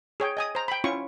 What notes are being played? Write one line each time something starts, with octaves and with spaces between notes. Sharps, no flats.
G#4 C#5 G5
D#5 G#5 D#6
C5 A#5
G5 B5
C#4 E4 F4 C#6